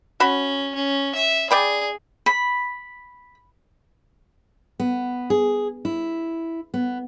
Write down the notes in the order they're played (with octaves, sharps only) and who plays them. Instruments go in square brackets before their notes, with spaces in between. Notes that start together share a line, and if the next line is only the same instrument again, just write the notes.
[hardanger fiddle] C#4 [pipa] F#4 B5
[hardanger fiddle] C#4
E5
[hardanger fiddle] G#4 [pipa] D5 G5 B5
[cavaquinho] B5
[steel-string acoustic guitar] B3
G#4
E4
B3